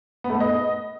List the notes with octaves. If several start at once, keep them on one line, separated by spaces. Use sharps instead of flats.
B3
A3
B3
D#5